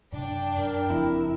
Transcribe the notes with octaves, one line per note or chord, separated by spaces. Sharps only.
F#2 C3 D4 G5
F#2 A#4
F#1 F2 C4 E4